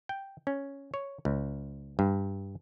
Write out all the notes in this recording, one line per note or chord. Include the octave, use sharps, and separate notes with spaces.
G5
C#4
C#5
C#2
G2